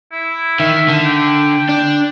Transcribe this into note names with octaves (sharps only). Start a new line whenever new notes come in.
E4
D#3 E5
D3
G5
D4